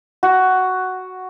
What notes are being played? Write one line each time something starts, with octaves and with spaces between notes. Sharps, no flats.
F#4